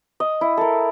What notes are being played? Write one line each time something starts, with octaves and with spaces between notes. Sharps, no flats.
D#5
E4
A4 A#4